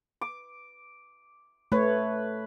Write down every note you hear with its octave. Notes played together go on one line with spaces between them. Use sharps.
D6
A3 B4 C#5